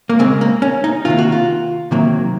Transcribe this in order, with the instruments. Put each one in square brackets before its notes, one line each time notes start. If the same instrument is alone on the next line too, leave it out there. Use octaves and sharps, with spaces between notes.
[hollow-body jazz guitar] A#3
C#3 G#3 C4
A#3
C#4
D#4
C3 D#3 A#3 F4
F#4
F4
C3 D#3 F#3 A#3